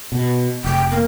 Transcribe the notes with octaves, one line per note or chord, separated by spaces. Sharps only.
B2
F1 G5
A#3